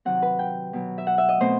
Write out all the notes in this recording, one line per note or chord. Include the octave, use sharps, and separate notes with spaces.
C3 D#3 F#3 C4 F#5
B4
G5
B2 F#3 B3
E5
F#5
E5
D#5
B2 A3 C4 C5